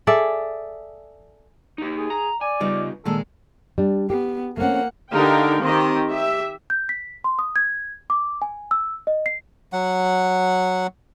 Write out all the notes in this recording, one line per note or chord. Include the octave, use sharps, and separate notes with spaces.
G#4 A4 D5 E5
D#4 G4
G#4
A#5
D5 G#5
C#3 G3 B3 D#4 F4
A#2 D#3 G#3 A#3 A4
G3 D4
B3 G4
A3 A#3 C4 C#4 F#5
D3 D#4 G4 A#4 F5 G5
D#3 C4 G4 D#5
G4 E5
G6
B6
C6
D#6
G#6
D6
G#5
E6
D#5
C7
F#3 F#5